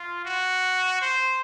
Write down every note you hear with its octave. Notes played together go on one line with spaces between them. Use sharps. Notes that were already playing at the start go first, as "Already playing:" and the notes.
Already playing: F4
F#4
C5